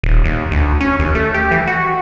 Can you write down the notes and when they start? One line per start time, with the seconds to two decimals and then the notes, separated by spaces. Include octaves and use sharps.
0.03 D#1
0.24 D#2
0.51 D2
0.80 C#4
0.99 D#2
1.15 A3
1.34 G4
1.51 E3
1.67 F#4